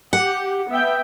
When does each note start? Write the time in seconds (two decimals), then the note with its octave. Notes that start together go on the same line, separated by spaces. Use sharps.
0.13 G4 F#5
0.69 B3 E5 G5